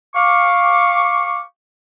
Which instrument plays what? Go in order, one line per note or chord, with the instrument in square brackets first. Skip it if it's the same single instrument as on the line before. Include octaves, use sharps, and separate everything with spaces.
[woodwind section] F5 C#6 D6